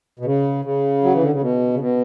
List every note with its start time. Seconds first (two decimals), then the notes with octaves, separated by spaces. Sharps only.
0.19 B2
0.25 C#3
0.65 C#3
1.04 F#3
1.14 E3
1.22 D3
1.32 C#3
1.41 B2
1.74 C#3
1.80 B2